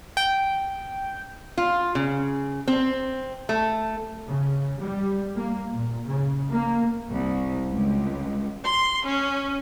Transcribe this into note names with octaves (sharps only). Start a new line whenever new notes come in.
G5
F4
C#3
C4
A3
C#3
G3
A#3
A#2
C#3
A#3
C2
C#2
C6
C#4